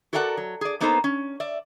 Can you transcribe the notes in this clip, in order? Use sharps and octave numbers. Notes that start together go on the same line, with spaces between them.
F#4 A4 A#4 D5 F5 F#5
F#3
G#4 D5
A#3 B3 D#4 A4 B4 C5
C#4
D5 E5